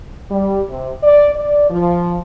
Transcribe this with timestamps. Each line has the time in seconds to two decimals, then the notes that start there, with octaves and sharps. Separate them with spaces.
0.30 G3
0.70 C3
1.03 D5
1.35 D5
1.70 F3